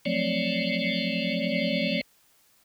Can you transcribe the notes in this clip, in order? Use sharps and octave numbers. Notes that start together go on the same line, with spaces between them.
F3 F#3 A3 C4 C#5 D5